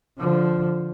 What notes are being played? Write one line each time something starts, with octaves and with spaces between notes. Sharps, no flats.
D3 F3